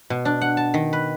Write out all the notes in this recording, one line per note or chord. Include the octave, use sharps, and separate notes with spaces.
B2
D4
F#5
A5
D#3
B4